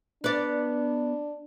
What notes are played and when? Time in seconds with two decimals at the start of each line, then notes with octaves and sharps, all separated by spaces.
0.24 B3 D4 D5